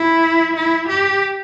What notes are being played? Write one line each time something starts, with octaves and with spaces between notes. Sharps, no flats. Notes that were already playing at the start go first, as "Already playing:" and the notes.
Already playing: E4
E4
G4